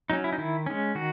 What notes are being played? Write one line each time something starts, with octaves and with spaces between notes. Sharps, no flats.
F#3 C#4 D#4
E4
D#4
D#3 E4
G#3 C#4
D#3 F#4